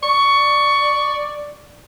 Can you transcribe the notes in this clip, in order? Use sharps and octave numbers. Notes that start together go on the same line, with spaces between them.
D5 C#6